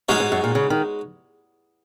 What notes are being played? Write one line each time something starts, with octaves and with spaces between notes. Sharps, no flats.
F#2 G#3 D#4 F#4 C#5
G#2
F#2
A#2
C#3
D#3